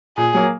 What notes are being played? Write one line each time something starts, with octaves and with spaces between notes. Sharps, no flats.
A#2 G#4
F#3 A#3